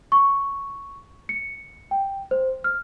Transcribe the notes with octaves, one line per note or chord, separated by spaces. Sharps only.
C#6
C#7
G5
C5
F6